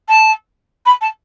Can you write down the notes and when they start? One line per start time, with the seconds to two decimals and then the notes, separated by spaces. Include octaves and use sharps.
0.08 A5
0.86 B5
1.01 A5